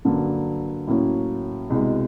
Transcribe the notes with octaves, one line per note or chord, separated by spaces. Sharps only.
G2 D3 F#3 A#3
A2 F#3 A#3 C#4
C2 B2 G#3